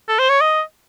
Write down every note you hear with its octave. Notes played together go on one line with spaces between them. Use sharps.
A4
C5
C#5
D#5